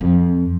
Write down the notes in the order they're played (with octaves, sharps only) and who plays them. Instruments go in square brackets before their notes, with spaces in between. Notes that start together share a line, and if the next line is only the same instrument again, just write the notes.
[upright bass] F2